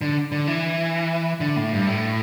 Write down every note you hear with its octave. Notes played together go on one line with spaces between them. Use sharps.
D3
D3
E3
D3
A2
G2
A2